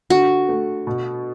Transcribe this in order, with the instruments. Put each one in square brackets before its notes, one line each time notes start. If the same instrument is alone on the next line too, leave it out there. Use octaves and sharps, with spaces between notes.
[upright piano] D3 [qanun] F#4
[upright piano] A3
B2